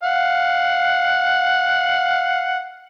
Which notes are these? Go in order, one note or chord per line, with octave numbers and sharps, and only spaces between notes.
F5 F#5